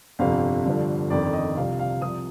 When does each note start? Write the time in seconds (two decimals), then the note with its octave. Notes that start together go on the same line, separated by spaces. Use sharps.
0.19 G1 F2 C3 F3 F5
0.65 G1 G2 D3 F3
1.10 G1 F2 D#3 D5
1.33 D#5
1.57 C2 C3 F3 F5
1.79 F5
2.02 C2 C3 F3 D#6